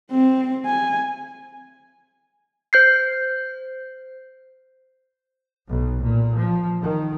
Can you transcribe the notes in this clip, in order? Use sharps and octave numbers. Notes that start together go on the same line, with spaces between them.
C4
G#5
C5 G6 C7
B1
A#2
F3
D#3